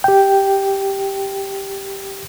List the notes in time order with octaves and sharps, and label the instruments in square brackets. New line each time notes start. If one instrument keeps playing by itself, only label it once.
[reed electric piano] G4 G5